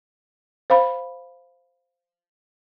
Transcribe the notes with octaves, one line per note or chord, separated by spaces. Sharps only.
C5 F5 B5